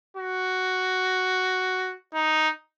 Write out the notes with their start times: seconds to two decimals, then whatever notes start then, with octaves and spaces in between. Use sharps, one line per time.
0.17 F#4
2.14 D#4